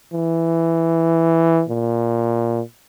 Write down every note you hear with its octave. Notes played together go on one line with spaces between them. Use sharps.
E3
A#2